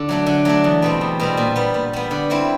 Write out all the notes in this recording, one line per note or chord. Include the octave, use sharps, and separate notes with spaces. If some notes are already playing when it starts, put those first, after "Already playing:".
Already playing: D3
F#3 A3 D4
D3
F#3 A3 D4
E2
B2 G3 C4
E2
B2 G3 C4
A#2
G3 B3
A#2
G3 B3
D3
G3 C4 E4